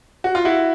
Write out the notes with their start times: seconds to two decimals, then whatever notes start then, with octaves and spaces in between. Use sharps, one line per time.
0.24 F#4
0.35 F4
0.45 E4 F#4